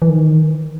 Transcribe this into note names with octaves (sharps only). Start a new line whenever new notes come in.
E3
D#3